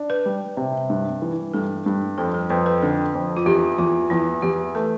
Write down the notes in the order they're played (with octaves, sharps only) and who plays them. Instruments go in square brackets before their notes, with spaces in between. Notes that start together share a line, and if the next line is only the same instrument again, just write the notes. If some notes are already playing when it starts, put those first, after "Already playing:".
Already playing: [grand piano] D4
[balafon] B4
[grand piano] G3
C3
G2
E3
[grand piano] G2 [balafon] A4
[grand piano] G2
[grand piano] F2 [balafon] A4
[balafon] A4
[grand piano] F2 [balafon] B4
[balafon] B4
[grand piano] D3 [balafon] A4
[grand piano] F2
[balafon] F4
[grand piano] E2 [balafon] G4
[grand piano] E2 [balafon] F4
[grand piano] E2 [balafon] E4
[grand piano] E2 [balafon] G4
[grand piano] A3 [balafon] B4